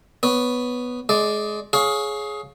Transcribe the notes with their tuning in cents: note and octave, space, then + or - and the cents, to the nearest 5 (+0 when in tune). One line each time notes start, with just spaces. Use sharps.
B3 +0 C#5 +0
G#3 +25 D5 +0
G#4 +15 C#5 +0 F5 +20